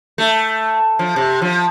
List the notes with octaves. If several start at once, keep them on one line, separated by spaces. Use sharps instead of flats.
A3
F3
C3
F3